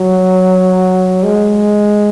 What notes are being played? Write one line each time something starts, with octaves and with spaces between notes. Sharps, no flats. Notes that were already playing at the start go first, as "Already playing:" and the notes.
Already playing: F#3
G#3